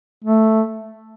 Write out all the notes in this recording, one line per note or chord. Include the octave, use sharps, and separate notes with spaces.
A3